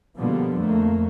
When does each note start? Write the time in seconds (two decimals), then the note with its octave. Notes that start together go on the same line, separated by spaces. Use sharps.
0.18 B2 D3 F3 G3 A#3 B3
0.60 F2 A3 A#3